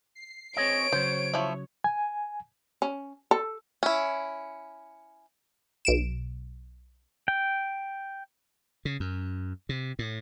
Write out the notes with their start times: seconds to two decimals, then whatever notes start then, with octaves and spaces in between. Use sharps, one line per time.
0.15 C7
0.57 C4 G#4 C#5 D#5 D7
0.92 C#3 F#3 C5
1.34 F3 E4
1.84 G#5
2.82 C#4
3.31 A4
3.83 C#4 E4
5.85 B1 D7 E7
7.28 G5
8.85 C#3
9.00 F#2
9.69 C3
9.99 A2